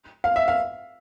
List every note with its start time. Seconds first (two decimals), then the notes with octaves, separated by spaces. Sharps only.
0.24 F5
0.36 E5
0.48 F5